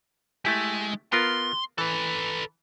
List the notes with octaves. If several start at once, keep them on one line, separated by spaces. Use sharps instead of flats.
G#3 A3 E4 G4
B3 F4 A#4 C6
E3 A4 B4